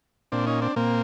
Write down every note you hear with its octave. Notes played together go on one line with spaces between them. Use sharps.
A#2 C4 D4
C#4 D#4
C4 D4
A#2 A#3 C4